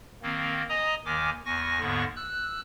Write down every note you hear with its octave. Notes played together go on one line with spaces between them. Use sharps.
D#3 A#3 C4
D#5 G#5 A#5 D#6
D#2 D#3 G#5 D6
E2 G#5 C#6 A#6
D#2 G#2 D3 B3 C#6
E6 F#6